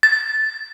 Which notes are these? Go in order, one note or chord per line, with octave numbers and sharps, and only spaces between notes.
A6